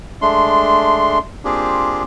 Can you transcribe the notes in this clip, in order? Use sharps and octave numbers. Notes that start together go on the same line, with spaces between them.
G#3 A3 D4 C6
A#3 C4 D4 F4 G4 G#4